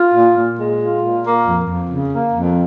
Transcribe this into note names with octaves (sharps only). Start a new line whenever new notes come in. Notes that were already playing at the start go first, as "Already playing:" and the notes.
Already playing: F4
A#2
A#2
G#3
F4
A#2
A#3
F2
F2
C#3
A#3
F2